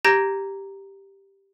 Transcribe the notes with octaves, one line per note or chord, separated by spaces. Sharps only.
G4 A#5 G6 G#6 A#6 D7